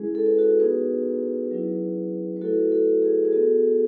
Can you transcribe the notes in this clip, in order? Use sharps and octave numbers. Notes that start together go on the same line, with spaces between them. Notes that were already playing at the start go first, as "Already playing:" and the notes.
Already playing: G#3 C#4 E4 G#4
A4
B4
F#4 A4
B3 D#4 F#4 G#4 B4
F#3 C#4 E4
B4
A3 E4 F#4 A4
F#4 A4
G#4
G#4
B3 F#4 A4